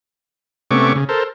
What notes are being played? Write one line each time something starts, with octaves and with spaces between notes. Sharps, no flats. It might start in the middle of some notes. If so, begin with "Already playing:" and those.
C3 A3 B3 C#4 C#6 D6
C#3
A4 A#4 C5